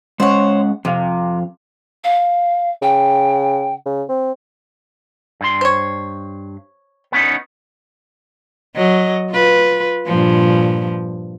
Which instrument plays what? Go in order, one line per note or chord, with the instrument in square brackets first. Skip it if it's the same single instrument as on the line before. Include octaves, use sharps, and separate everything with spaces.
[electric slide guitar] G#3 C#4 F#5 [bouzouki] C5 C#5
[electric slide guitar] F2 F5 [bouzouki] C3
[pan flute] F5
[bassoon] C#3 [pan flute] G5
[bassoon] C#3
C4
[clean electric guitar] G2 C6
[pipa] C5 C#5
[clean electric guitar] B3 C#4 D#4
[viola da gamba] F#3 D#5
F4 B4
G2 A#2 F3